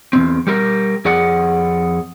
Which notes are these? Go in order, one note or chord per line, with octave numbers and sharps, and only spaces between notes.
E2 A#2 C4
G3 G4 A#4
F2 G#4 D5 F#5